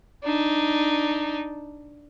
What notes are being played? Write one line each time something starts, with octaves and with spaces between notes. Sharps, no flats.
D4 D#4